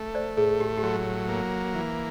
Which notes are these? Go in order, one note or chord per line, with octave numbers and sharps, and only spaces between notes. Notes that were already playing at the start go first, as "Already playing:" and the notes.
Already playing: A3
C5 D5
A2 G#4
G4
G4
F#3 F#4
A#3
E3